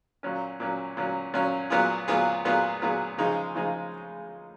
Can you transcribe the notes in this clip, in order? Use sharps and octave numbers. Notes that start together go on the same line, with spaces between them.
A#2 F#3 C#4
A#2 F#3 C#4
A#2 F#3 C#4
A#2 F#3 C#4
A#2 F#3 B3 F4 G#4
A#2 F#3 B3 F4 G#4
A#2 F#3 B3 F4 G#4
A#2 F#3 B3 F4 G#4
C#3 F3 G#3 D#4 G#4
C#3 F3 G#3 D#4 G#4